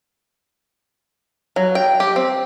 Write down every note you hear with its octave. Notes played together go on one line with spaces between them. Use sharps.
F#3
G5
G4
C4